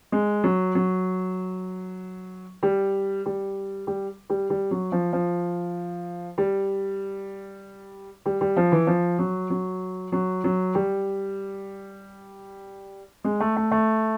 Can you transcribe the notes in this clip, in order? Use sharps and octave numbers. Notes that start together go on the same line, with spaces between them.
G#3
F#3
F#3
G3
G3
G3
G3
G3
F#3
F3
F3
G3
G3
G3
F3
E3
F3
F#3
F#3
F#3
F#3
G3
G#3
A3
A3
A3